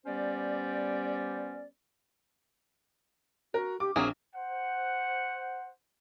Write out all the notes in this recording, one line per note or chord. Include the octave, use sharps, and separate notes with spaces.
G3 B3 C#4 G4 C5 D5
F#4 A#4
G4 D6
A#1 F#3 A#3 C4 G#4
C5 F#5